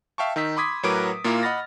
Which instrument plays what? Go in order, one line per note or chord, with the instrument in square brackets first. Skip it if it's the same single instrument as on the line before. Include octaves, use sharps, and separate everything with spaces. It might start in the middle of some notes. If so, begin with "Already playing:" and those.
[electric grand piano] E5 F5 G5 A5 C#6
D#3 D#4 E6 B6
B5 C6 D6 D#6 G#6 B6
A2 F#3 A#4 B4 D6 D7
A#2 A#3 E4 F4 A#5
D#5 F#5 B5 F6 A6 A#6